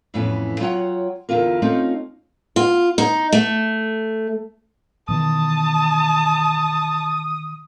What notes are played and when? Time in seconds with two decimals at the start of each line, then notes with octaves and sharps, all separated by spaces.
0.14 F2 A2 E3 B3 C#4 E4
0.60 F#3 F4 C#5 E5 F#5 G5
1.29 E2 D3 E4 F4 A#4
1.62 A3 C4 C#4 D#4 F4
2.56 F4
2.98 D#4
3.32 A3
5.09 B2 D#3 E3 A5 D#6